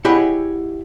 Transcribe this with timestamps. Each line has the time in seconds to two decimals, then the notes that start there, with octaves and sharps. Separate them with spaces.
0.05 E4 G4 G#4 C#5 D#5 F#5